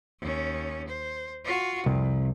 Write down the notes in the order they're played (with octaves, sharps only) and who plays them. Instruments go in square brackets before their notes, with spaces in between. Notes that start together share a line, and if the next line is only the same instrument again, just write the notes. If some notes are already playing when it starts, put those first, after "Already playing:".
[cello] D#2 C#4
C5
F4 F#4
[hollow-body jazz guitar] C2 [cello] F2